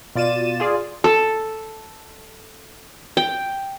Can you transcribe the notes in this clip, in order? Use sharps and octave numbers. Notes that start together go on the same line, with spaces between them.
B2 F4 D5 A6 D#7 E7
F4 G#4 D5
A4
G5